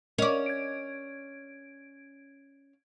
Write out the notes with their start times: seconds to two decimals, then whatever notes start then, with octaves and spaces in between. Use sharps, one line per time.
0.18 C#4 A#4 D5 D#5
0.46 G#6 D7